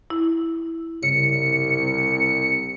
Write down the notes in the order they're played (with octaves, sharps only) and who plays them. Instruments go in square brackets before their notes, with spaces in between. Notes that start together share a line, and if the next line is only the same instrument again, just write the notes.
[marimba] E4
[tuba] C2 [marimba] G2 C#3 [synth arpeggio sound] C#7